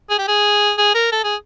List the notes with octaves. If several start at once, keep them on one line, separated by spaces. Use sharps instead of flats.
G#4
G4
G#4
G#4
A#4
A4
G#4